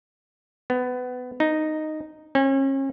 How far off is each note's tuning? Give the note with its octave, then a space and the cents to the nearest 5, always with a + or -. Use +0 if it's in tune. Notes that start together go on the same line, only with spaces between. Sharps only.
B3 +20
D#4 -5
C#4 -40